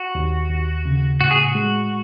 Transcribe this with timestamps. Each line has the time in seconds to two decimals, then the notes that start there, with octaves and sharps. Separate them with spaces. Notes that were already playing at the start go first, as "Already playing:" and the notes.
Already playing: F#4
0.15 D#2
0.50 D#2
0.86 C#3
1.21 A2 F#4
1.31 G#4
1.42 F#4
1.55 G#3